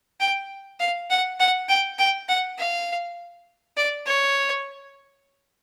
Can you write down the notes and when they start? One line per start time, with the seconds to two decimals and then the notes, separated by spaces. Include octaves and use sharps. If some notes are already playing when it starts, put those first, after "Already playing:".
0.20 G5
0.80 F5
1.10 F#5
1.40 F#5
1.68 G5
1.99 G5
2.29 F#5
2.58 F5
3.77 D5
4.06 C#5